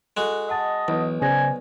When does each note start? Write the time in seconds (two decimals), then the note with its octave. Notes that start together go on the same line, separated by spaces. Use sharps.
0.17 G#3 F#4 A4 F#6
0.49 D#5 F#5 A5 A6
0.88 B1 E3
1.22 C#3 C5 D5 G#5 A#6